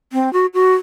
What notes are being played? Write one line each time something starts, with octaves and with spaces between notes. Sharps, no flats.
C4
F#4
F#4